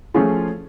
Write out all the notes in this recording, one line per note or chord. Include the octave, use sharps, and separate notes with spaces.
F3 A3 C#4 F4 G#4